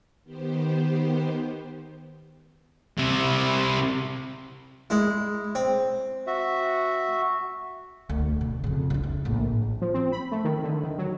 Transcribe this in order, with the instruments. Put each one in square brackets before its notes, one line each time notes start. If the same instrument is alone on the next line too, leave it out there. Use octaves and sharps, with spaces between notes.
[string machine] D#3 B3 G4 C5
[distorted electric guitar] C3 E4
[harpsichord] G#3 E4
C4
[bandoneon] F#4 E5
[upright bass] D2
B2
F2 C#3
F3 D4
E4
A#1 A2
[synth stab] F3
C4
B5
A3
D#3
D3
D#3
F#3